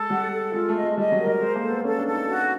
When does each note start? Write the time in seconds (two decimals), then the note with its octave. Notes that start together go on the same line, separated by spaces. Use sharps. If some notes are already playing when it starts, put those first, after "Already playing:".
Already playing: G#3 A4
0.10 G3 F#5
0.32 A4
0.54 G#3 F4
0.69 A3
0.75 D#5
0.83 G#3
0.97 G3 D#5
1.12 F#3
1.19 A#4
1.27 G3
1.41 G#3 C5
1.56 A#3
1.63 A4
1.69 B3
1.84 C#4 A4
1.99 D4
2.06 A4
2.13 D#4
2.28 F#4